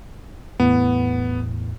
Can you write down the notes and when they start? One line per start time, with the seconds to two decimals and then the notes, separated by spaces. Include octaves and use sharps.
0.60 E2 A2 B3